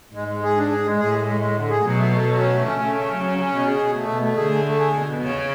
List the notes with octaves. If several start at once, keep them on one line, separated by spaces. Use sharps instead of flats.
G#2 G#3
G#3
G#4
D4
G#4
G#3
A2 G#4
G#3
G#3
G#3
D3
G#4
B2 F#3
A3
A3
F#3
C#4
A3
C#3 C#4
A3
C#4
F#3
C#4
C#4
B2
G#4
B2
A3
B2
A3
D3 G#4
A3
A3
G#4
B2
B2
E2 C#3